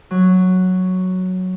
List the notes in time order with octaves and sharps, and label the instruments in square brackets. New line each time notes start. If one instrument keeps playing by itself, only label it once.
[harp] F#3